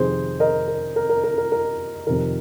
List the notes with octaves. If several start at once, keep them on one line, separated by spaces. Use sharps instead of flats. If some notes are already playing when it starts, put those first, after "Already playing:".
Already playing: F2 C3 D#3 G#4 C5
A#4 D#5
A#4
A#4
A#4
A#4
A#4
A#4
F2 C3 D#3 A#4